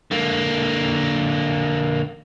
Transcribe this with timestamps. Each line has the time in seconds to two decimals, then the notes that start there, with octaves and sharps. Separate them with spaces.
0.11 D3 A#3